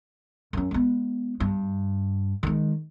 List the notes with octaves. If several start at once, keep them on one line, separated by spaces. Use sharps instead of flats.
F#2 C#4
G#3 B3
G2
D#3 G#3